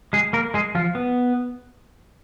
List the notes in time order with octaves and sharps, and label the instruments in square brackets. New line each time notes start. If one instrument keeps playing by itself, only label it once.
[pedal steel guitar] G#3 G#4
A#3 A#4
G#3 G#4
F3 F4
B3